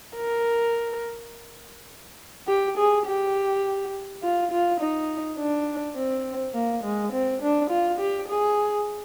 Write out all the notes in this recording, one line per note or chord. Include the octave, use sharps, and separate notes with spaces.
A#4
G4
G#4
G4
F4
F4
D#4
D4
C4
A#3
G#3
C4
D4
F4
G4
G#4